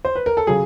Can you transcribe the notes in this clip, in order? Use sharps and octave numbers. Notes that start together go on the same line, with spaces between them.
C5
B4
A#4
A4
C#3 F#3 G#4